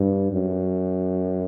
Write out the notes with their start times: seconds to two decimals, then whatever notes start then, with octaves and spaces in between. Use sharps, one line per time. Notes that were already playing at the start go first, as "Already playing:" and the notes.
Already playing: G2
0.33 F#2